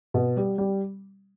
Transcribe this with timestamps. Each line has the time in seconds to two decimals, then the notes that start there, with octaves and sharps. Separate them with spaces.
0.14 B2
0.37 G3
0.58 G3